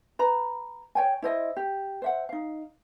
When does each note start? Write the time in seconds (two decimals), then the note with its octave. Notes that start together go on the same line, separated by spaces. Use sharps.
0.19 B4 A#5 B5
0.95 C#5 G5 G#5
1.22 E4 C5 D#5 E5
1.57 G4
2.02 C5 E5 F#5
2.29 D#4 F5